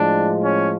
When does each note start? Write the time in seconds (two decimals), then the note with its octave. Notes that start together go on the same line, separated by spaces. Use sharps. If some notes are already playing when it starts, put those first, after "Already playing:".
Already playing: A2 F3 G#3 D4
0.41 C#4